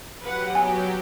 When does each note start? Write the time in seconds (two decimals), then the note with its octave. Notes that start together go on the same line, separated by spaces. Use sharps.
0.22 F#3 G4 B4 F#5
0.55 B3 G#5